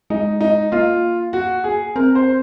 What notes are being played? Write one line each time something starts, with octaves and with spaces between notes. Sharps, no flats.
G#3 D#4
D#4
A#3 F4
F#4
G#4
C4 A#4
C5